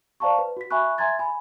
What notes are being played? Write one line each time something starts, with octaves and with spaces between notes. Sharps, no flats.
C5 D5 F5 A5 A#5 C#6
B4
F#4 B6
E5 G#5 B5 C#6 F#6
E5 G#5 A#5 C6 G#6 A6
G#5 B5